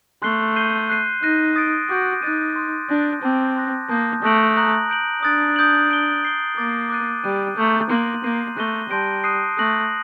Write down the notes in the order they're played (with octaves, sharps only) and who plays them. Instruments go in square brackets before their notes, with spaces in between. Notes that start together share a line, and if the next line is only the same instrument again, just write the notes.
[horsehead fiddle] A3 [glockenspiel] C6 F#6 C7 G7
[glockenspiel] G6 C7 D#7 G7
F#6 C7 D#7
[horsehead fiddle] D#4 [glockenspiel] F#6 A#6 D#7
[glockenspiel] D#6 A6 D7
[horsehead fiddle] F#4 [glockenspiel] D6 G6 D7
[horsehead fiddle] D#4 [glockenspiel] F#6 A6 D#7
[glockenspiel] C6 D#6 F#6
[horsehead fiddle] D4 [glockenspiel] D#6 G6 A#6
[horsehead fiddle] C4 [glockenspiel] A5 D6 G6
[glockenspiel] C6 D#6 F#6 A#6
[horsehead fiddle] A#3 [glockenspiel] A5 D#6 G6
[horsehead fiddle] A3 [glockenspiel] D#6 F#6 A#6 D7 F#7
[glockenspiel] A#5 D#6 F#6 A#6 F#7
G6 D7 F#7
[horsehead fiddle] D4 [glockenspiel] D#6 F#6 A6 D7
[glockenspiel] D#6 G6 D7 F#7
G6 D7 G7
G6 C7 G7
[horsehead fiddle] A#3 [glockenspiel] D6 A6 D7
[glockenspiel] D6 F#6 A6 D#7
[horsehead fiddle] G3 [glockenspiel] F#6 A6 D#7
[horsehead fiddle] A3 [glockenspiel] A#5 D#6 G6
[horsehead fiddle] A#3 [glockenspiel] C6 F#6 A#6 D#7 F#7
[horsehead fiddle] A#3 [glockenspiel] G6 C7 D#7
[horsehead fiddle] A3 [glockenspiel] F#6 A#6 D#7 G7
[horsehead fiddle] G3 [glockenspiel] A5 C6 G6 A#6 D7
[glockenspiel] D#6 F#6 C7 D#7
[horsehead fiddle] A3 [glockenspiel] D#6 F#6 A#6 F#7